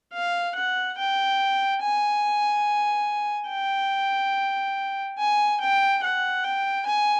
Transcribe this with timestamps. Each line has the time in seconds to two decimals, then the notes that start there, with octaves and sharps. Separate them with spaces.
0.14 F5
0.56 F#5
0.99 G5
1.83 G#5
3.50 G5
5.19 G#5
5.61 G5
6.04 F#5
6.44 G5
6.86 G#5